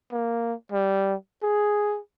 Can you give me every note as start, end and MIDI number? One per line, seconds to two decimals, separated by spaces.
0.12 0.54 58
0.72 1.15 55
1.43 2.00 68